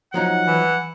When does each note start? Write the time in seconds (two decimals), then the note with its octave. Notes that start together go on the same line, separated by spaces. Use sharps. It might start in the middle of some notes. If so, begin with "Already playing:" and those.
0.14 F3 F#3 D#4 F#5
0.47 E3